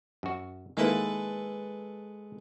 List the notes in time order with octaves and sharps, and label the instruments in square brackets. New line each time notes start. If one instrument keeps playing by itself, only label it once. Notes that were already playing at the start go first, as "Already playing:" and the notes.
[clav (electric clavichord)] F#2 F#4
[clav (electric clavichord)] D#3 A#3 E4 [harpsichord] G#3 A4 B4